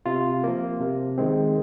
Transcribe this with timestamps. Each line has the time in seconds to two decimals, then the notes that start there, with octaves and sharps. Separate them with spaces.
0.06 C3 F4
0.44 F3 A#3
0.81 C3
1.18 D#3 G#3 C4